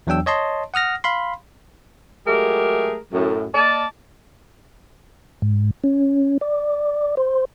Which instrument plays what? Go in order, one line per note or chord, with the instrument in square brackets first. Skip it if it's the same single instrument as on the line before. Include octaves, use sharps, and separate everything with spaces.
[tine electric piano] E2 F#3 D4 G5 E6
C#5 D#5 A5 C6
F#5 D#6 F6 A#6
F5 B5 C6
[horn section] F#3 G#3 A3 G4 G#4 A#4
F#2 A2
A#3 D5 D#5 A5
[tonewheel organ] G#2
C#4
D5
C5